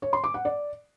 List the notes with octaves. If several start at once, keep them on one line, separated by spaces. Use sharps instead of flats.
C#5
C6
D6
F#5
D5